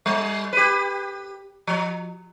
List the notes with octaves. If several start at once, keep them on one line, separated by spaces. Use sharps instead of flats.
G3
G4 B4
F3